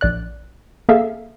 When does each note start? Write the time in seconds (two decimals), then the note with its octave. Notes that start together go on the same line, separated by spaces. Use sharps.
0.01 A#1 D5 F#6
0.89 A#3 G#4 A4 E5 F5